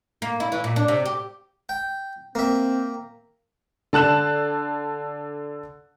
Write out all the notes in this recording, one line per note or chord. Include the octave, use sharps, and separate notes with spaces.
A#3
E4
E3
A#2
D4
C3
G4
G5
A#3 C4 E5
D3 A5 F#6 E7